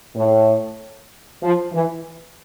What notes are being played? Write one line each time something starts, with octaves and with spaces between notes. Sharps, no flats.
A2
F3
E3